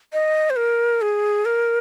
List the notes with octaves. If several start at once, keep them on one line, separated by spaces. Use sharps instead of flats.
D#5
C5
A#4
G#4
A#4